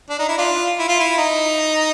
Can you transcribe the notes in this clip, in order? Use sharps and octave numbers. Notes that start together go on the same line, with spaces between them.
D4
D#4
E4
D4 F4
E4
F4
E4
D#4